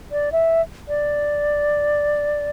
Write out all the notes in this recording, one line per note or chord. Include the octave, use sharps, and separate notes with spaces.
D5
E5
D5